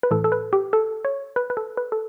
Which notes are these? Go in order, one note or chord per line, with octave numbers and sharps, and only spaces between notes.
B4
A2 E3 A4
A4
B4
G4
A4
C#5
B4
B4
A4
B4
A4